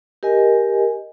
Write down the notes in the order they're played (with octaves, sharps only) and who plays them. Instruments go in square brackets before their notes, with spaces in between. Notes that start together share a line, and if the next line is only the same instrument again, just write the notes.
[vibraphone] G4 A#4 D#5 G#5